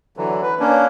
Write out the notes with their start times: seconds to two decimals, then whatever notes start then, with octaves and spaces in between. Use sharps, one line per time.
0.17 D3 E3 F#3
0.42 B4
0.60 A#3 C#4 D4